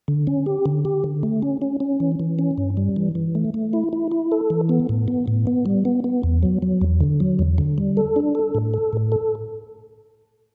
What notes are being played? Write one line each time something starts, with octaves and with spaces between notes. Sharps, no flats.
D3
C#4
G4
D3
G4
D3
A3
C#4
C#4
C#4
E3
E3
C#4
G2
G3
E3
E3
A3
A3
E4
E4
E4
A4
E3
B3
A2
B3
A2
B3
G3
B3
B3
E2
F#3
F#3
E2
D3
F#3
E2
D3
G3
A4
D4
A4
A2
A4
A2
A4